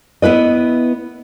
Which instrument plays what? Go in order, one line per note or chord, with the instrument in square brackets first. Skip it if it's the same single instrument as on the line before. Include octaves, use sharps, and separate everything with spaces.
[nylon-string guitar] B3 E4 B4 D#5